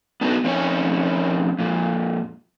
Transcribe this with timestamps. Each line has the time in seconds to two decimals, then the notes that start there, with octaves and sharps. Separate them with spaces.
0.21 B3 D4 D#4 F#4 A#4 B4
0.44 F3 C4 C#4 D#4 C#5
1.59 F2 A#2